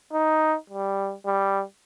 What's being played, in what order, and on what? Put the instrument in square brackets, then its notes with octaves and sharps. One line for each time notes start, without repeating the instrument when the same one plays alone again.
[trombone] D#4
G3
G3